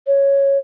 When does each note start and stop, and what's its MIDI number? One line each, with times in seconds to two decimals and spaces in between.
0.07 0.58 73